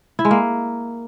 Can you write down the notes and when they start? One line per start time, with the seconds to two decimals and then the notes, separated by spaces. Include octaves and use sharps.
0.19 E4
0.25 G#3
0.31 A#3